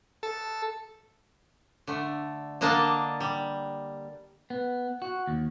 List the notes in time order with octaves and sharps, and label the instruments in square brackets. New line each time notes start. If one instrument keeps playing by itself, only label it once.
[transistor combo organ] A4
[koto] D3 A3
D3 A#3 D4 D#5 F5 A5
G3
[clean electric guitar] B3
F#4
D#2